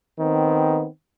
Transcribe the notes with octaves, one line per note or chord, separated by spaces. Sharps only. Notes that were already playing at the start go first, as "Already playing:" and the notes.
D#3 B3 C4